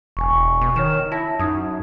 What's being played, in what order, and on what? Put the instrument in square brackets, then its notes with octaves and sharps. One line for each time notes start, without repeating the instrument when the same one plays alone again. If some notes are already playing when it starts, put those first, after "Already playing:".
[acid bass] E1 [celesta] G#5 C#6
[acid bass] B2
[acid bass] D#3 [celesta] C#5 F6 E7
[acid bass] E4 [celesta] A5 A#6
[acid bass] F#2 [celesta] D#4 D#6 G#6